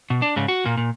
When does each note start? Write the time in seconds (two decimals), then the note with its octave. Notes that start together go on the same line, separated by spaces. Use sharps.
0.10 B2
0.22 D4
0.36 G#2 C#3
0.48 F#4
0.65 A#2 A#3
0.77 A#2